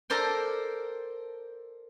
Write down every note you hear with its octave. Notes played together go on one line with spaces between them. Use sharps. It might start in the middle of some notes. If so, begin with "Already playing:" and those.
A4 A#4 C5 D5 G5